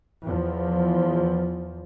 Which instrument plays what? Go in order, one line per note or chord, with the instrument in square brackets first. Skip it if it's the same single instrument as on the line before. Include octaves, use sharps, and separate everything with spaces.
[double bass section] E2 F3